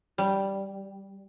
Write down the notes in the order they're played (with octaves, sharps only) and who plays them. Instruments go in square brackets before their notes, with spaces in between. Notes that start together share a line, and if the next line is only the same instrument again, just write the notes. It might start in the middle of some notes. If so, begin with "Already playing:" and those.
[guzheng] G3